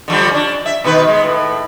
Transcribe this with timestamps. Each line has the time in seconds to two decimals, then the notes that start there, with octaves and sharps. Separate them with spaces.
0.08 D3 F3 G3
0.31 C#4 D4
0.66 E5
0.84 B2 D#3 B4
1.07 G#3 B3
1.24 A2